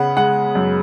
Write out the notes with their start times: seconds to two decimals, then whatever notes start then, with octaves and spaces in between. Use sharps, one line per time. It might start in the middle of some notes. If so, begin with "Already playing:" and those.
Already playing: C#3 B3 F#5
0.17 G#3 F#5
0.55 F#2